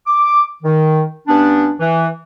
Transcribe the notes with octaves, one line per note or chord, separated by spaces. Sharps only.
D6
D#3
G2 B3 C#4 D4
E3